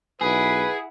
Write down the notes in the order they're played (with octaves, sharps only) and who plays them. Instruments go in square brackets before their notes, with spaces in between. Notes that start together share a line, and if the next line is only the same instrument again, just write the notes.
[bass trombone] B1 [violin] E4 F#5 [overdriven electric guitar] G#4 [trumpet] B4